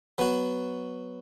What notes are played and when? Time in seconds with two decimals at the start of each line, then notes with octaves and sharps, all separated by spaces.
0.18 F#3 B3 F#4